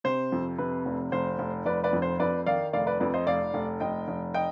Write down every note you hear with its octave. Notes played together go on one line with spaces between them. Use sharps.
C3 C5
F2
C3 B4
F1
F1 C5
F1
F1 B4 D5
B4 D5
F2
C5
F2 B4 D5
D#3 D5 F5
F1 D5 F5
B4 D5
F2 B4 D5
C5 D#5
F1 D5 F5
F1
F1 D#5 G5
F1
D#5 G5